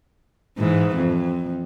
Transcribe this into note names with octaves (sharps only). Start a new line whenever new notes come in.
G#2 E3
F2